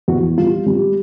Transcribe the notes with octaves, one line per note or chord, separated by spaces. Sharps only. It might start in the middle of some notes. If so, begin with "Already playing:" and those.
E2 F#4
G3 F4
G3